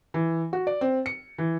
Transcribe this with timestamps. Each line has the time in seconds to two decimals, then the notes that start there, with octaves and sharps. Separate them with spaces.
0.14 E3
0.53 F#4
0.67 D5
0.81 C4
1.06 C#7
1.38 E3